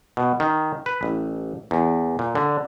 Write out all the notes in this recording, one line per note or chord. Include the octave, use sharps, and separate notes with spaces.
B2
D#3
B4
A1
E2
A#2
D3